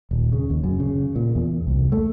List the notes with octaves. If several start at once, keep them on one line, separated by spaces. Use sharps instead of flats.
D#1
C#3
D#2
F#2
C#3
A#2
E2
C2
A3